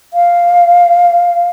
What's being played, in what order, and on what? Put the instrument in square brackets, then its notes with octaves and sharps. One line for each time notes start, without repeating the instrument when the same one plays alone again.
[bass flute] F5